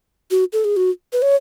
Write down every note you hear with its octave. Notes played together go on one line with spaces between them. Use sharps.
F#4
A4
G#4
F#4
B4
C#5